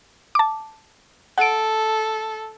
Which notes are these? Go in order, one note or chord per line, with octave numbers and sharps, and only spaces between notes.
A5 D6
A4 F#5 D7